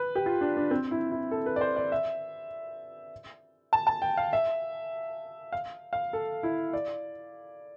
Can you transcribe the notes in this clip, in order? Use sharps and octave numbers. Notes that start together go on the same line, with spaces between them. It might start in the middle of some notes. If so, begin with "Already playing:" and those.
Already playing: B4
G4
F4
D4
D4
C4
E4
E4
A4
B4
D5
C5
D5
E5
A5
A5
G5
F5
E5
F5
F5
A4
E4
D5